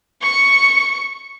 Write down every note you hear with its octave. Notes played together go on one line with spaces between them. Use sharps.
C#6 C#7